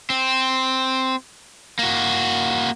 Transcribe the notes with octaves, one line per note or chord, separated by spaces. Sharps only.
C4
A#3 F#4